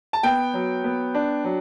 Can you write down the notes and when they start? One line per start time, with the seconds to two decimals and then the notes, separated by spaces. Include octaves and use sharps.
0.13 A5
0.23 B3 G5
0.54 F#3
0.84 B3
1.15 D4
1.44 F#3